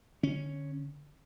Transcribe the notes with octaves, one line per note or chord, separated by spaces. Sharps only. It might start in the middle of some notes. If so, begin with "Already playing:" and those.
D3 C#4